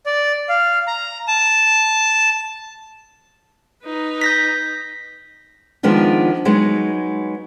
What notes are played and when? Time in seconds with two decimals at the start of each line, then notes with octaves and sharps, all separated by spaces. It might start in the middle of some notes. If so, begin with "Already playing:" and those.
0.06 D5
0.49 F5
0.87 A#5
1.28 A5
3.84 D#4 B4
4.21 G6 A#6 B6
5.83 D#3 F3 G#3 B3 D4 F4
6.45 F#3 G#3 B3 D#4